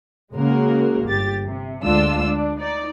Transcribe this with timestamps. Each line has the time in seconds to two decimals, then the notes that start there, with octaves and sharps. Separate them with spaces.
0.33 C#3 G#3 A#3 F#4 A#4
1.05 G1 G4 A6
1.45 C3
1.83 D2 G#3 D4 F4 E6
2.24 D4
2.60 D#4 D5